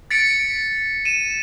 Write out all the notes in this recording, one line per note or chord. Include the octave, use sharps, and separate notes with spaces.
A6 B6 C#7 D7
D#7 E7